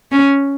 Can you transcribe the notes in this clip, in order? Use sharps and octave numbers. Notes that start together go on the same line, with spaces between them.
C#4